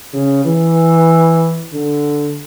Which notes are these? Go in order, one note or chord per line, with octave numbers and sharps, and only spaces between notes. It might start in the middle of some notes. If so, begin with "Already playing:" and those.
C#3
E3
D3